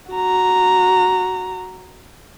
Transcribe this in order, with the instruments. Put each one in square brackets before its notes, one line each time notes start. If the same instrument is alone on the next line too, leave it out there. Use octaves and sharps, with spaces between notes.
[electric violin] F#4 A#5